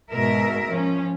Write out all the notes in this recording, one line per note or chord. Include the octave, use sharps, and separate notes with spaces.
G#2 B2 G#3 A#4 E5
F3 C#4